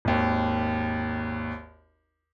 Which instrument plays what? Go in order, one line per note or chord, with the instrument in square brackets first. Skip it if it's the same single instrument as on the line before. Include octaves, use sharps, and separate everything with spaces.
[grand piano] G#1 D#2